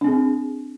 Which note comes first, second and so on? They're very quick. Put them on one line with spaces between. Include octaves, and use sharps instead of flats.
D4 C4 G#4